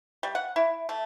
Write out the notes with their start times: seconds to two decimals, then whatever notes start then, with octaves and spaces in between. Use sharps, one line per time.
0.23 G3
0.35 F#5
0.56 E4
0.89 A3